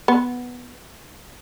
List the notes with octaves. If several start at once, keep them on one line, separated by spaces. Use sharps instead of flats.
B3